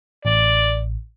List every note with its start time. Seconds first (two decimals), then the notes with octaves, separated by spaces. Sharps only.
0.25 A1 D5